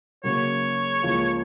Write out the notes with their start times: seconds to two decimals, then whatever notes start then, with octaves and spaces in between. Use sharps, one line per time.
0.23 C#3 F#3 A#3 C#5
1.03 C#2 C#3 F3 A#3 F4